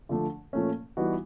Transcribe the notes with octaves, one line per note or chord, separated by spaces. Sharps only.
D3 F3 A3 D4
A#2 F3 A3 C#4
E3 G3 B3 D#4 F#4